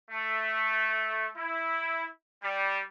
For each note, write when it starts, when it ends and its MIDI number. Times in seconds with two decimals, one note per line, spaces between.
0.11 1.28 57
1.36 2.07 64
2.44 2.81 55